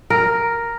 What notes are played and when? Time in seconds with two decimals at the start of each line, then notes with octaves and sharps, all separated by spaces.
0.10 A#4